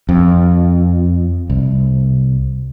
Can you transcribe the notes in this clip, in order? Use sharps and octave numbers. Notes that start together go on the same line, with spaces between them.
F2
C2